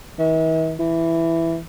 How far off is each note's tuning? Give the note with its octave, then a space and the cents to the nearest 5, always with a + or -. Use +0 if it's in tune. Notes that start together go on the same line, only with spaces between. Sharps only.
E3 -45
E3 +5